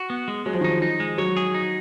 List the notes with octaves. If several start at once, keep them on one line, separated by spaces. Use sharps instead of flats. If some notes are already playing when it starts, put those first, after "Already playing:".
Already playing: F#4
B3
G#3
F#3 G#3
F3
D#3
D#4
F3
D#4
G#3
F#3 C#5
G#4
D#4